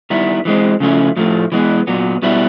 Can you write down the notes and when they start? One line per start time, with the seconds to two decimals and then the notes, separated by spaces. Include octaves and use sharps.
0.10 D#3 G3 B3 E4
0.45 E3 G#3 C4
0.80 C#3 F3 A3 C#4 E4
1.17 A2 F3 A3
1.52 E3 G#3 B3
1.87 A#2 F#3 B3
2.22 B2 G3 B3 E4